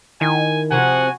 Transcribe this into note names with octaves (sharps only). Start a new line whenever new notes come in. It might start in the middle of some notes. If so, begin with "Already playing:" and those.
D#3 E4 G#5
C3 F3 F#4 F#5 G#5